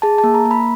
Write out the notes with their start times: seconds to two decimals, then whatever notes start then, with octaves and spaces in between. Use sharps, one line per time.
0.02 G#4 A5
0.18 A5
0.24 A#3
0.34 A#5
0.46 A#3
0.51 B5